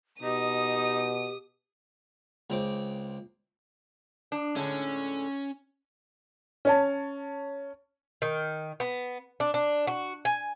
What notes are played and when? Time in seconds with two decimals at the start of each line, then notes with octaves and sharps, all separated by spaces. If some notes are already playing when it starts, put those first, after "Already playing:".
0.23 B2 D#4 G4 D#6 D#7
2.50 C#2 C4 D6
4.32 D4
4.56 A2 D3 G#3 C#4
6.65 C#4 C#5 A5
8.22 D#3
8.80 B3
9.40 D4
9.54 D4
9.87 F#4
10.25 G#5